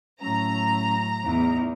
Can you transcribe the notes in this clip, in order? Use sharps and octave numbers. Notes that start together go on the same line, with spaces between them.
A2 F#3 C#4 A#5
E2 D#4